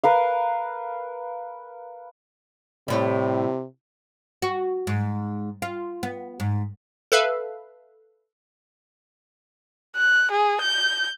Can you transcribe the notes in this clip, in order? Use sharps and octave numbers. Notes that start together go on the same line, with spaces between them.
A#4 B4 F5
A2 C3 G3
F#4
G#2
F4
B3
G#2
A4 B4 E5 F5
F#6
G#4
G6